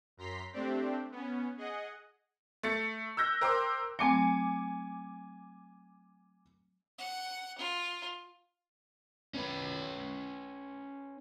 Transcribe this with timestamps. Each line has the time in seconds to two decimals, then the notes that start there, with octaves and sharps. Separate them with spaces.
0.17 F#2 A#5 C6 B6
0.53 A3 C4 D4 G4
1.11 B3 C#4
1.57 G#4 D#5 F#5
2.63 A3 A6 C#7
3.17 E6 F#6 G6 A#6
3.41 A#4 C5 G5 C6 D6 E6
3.99 F#3 A3 C4 G#5 D6 C#7
6.99 F#5
7.59 F4
9.34 C#4 B4